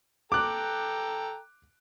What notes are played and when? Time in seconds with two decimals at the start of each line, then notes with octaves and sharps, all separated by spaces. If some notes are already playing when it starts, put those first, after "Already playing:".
0.32 A4 G5 A#5 D6 F#6